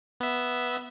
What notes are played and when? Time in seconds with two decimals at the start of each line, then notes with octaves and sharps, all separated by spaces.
0.20 B3 E5